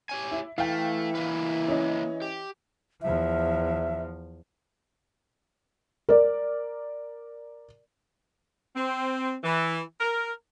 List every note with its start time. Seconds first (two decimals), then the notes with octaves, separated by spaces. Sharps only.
0.09 G4 C#5 G#5
0.32 E4
0.58 E3 A3 F5 G5
1.15 A#3 E4 B4
1.68 C#4 D#5
2.22 G4
3.02 E2 F3 E5
6.09 A#4 D5
8.75 C4
9.44 E3
10.00 A#4